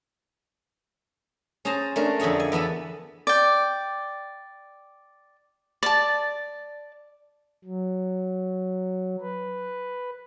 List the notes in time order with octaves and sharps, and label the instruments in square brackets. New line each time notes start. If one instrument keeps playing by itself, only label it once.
[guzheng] C#4 G#4 C5 A5 A#5
A3 C#4 D4 A#4
F2 D3 G4 G#4 C#5
G#5
E2 B3 A4 A5 B5
[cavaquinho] D5 G5
D5 A5
[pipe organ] F#3
B4